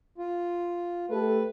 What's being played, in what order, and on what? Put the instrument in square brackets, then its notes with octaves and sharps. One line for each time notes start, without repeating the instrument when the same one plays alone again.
[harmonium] F4
[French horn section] A3 G4 A4 [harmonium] B4